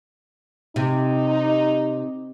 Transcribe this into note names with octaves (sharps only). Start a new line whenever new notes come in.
C3 D#4